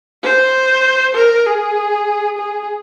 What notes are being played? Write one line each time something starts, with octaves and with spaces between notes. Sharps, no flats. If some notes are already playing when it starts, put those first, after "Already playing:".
C5
A#4
G#4
G#4